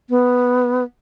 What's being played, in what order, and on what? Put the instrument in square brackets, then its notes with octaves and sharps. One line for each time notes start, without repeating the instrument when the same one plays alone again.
[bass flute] B3